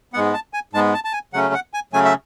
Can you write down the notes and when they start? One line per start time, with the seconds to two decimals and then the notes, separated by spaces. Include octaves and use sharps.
0.13 G#2 G#3 B3 F#5
0.34 A5
0.53 G#5
0.73 G#2 G#3 B3 A5
0.94 A5
1.05 A5
1.13 G#5
1.33 C#3 F#3 A3 C#4 F#5
1.54 F#5
1.74 G#5
1.93 C#3 F#3 A3 C#4 G#5
2.05 E5